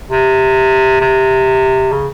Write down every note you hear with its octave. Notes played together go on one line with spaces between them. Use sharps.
C3
C3
C#3